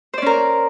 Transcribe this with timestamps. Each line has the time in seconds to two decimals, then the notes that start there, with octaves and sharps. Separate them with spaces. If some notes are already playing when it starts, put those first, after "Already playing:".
0.14 C5
0.18 D5
0.22 C#4
0.26 A#4